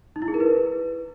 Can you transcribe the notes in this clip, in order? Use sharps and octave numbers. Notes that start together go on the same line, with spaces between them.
D#4
E4
G#4
A#4
B4